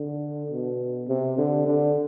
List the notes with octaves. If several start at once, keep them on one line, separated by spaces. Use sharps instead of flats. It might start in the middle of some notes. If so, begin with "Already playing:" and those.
Already playing: D3
B2
C3
D3
D3